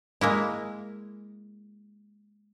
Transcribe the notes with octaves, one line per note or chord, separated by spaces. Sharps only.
G#3 A#3 E4